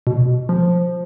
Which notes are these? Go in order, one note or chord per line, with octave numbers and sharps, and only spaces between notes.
B2
F3